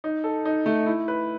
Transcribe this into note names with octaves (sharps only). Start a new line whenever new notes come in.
D#4
A4
D#4
A3
E4
B4